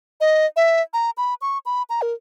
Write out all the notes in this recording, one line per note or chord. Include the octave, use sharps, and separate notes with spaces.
D#5
E5
A#5
B5
C#6
B5
A#5
A#4